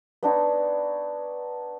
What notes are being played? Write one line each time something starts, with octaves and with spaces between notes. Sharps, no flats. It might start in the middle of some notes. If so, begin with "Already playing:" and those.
B3 D4 D#4 C#5